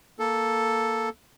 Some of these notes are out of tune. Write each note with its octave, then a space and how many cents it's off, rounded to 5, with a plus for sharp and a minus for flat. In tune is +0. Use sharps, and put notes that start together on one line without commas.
A#3 +0 A4 +0